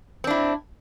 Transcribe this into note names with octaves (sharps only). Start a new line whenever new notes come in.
C4 D4 E4